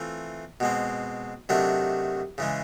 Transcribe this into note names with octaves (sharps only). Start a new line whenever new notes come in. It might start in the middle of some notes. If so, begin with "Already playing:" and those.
Already playing: E3 A3 C4 F4
B2 G#3 C4
C3 D#3 F#3 A3 D4
C#3 E3 G#3